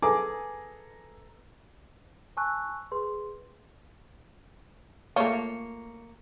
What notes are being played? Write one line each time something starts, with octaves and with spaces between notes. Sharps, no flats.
G#4 A4 B4 A#5 D6
G#5 A5 C#6 E6 F#6
G#4 B4 C6
A3 A#3 F4 C#5